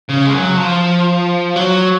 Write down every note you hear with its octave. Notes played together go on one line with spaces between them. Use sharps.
C#3
G#3
F#3
F3
F#3